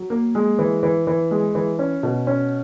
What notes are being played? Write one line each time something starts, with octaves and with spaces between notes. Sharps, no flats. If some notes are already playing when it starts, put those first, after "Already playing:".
Already playing: F#3
A#3
G#3
E3
E3
E3
G#3
E3
C#4
B2
C#4